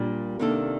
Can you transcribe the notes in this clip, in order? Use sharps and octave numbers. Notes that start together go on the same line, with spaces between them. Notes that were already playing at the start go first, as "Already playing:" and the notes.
Already playing: A#2 G3 A#3 D4 G4
C3 D#3 A#3 D4 A4